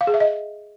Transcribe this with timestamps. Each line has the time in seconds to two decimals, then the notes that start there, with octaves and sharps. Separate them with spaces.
0.01 F5
0.07 G#4
0.14 E5
0.20 D#5